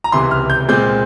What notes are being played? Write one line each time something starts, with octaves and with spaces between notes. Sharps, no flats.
A#5
C#2 C3 E3 C6
F6
G6
A#2 G#3 C4 G6